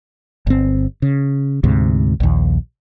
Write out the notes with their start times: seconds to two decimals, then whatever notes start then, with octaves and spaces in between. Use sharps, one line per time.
0.47 G1 C4
1.02 C#3
1.64 D2 G#2 C3
2.20 A#1 D#2